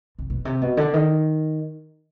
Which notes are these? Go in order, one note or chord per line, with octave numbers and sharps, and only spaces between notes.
C3
B2
C3
B2
D3
D#3